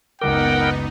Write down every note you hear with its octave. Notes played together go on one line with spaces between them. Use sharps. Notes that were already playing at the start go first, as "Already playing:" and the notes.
F#1 C#2 B3 D#4 A#4 F#5 G5 D6